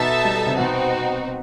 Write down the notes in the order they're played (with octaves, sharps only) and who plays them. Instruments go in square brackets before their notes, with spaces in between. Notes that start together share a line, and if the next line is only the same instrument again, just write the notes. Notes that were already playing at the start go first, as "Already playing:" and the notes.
Already playing: [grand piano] B2 B3 [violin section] D#4 A4 E5 A5
[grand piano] G3
C3 C4
[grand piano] B2 B3 [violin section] C4 D#4 F#4